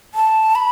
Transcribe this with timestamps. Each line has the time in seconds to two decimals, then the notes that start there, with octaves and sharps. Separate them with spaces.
0.15 A5
0.55 B5